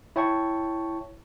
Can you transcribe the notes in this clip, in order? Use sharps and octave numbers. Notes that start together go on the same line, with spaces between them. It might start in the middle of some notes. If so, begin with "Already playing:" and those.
E4 C#5 G5 A5 C#6